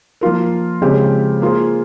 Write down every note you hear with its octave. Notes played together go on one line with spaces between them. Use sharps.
F3 A#3 F4 A#4
C#3 F3 G#3 C4 G4
A#3 F4 G#4 C5